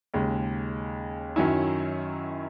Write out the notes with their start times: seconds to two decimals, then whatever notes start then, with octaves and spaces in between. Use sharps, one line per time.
0.14 D#2 C#3 G#3
1.36 F#2 D#3 F#3 C#4 E4